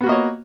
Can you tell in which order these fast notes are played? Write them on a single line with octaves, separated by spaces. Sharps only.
B3 F#4 A#3 D#5 C#5